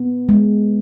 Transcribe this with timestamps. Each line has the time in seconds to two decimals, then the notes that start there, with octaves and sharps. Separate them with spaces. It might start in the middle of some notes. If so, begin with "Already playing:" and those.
Already playing: B3
0.29 G#3